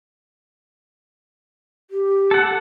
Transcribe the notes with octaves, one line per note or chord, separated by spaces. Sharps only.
G4
A4 F#5